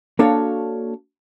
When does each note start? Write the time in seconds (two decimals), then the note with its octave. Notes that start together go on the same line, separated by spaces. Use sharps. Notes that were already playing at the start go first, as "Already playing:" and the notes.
0.19 A#3 D4 F#4 A4 C#5 F5